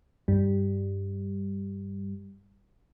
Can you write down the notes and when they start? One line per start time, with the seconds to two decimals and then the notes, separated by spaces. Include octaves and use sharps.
0.28 G2 G3